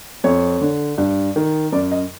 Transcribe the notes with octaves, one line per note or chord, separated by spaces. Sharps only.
F2 C#5
D3
G2
D#3
F#2 D5
D#5